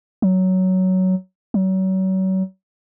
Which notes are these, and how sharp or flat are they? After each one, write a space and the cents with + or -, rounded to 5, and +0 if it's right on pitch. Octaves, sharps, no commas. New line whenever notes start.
F#3 +10
F#3 +35